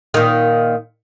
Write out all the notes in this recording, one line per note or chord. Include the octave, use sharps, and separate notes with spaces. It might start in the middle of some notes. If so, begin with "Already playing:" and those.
A#2 D#3